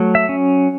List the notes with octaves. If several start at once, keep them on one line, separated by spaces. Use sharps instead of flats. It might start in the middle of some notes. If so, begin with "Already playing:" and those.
Already playing: F#3 A3
E5
C#4